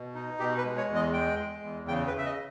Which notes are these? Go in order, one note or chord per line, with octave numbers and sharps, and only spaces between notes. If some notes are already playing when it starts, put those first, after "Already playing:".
Already playing: B2
D#4
B2 G4
B4
G#3
C#5
E2
D#5
G#3 G5
G#3
E2
C#3 G5
B4
C#3 E5
D#5